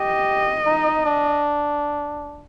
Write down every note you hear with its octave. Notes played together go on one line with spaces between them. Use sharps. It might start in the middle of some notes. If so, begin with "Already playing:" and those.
Already playing: G4 D#5
D#4
D4